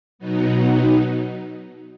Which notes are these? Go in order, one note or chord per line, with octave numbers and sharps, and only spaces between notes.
B2 F#3 B3 D#4